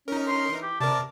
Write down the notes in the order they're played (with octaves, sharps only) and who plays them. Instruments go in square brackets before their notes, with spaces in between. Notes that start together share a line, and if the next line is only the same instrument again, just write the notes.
[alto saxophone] C#4 [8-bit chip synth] D#4 A#4
[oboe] C6
[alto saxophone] E3
[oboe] G4
[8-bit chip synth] C3 A#4 [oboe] D5 [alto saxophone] A5